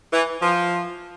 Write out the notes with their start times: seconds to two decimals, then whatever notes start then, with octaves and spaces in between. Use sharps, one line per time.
0.12 E3
0.41 F3